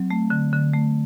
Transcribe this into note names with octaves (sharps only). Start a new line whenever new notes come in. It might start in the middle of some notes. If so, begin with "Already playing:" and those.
Already playing: F#3 C4
A3
D3
D3
A3